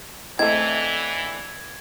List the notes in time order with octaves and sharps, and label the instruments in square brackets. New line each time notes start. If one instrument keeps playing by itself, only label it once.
[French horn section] D3 E3 [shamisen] A3 C4 [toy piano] E4 D#5 [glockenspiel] G#6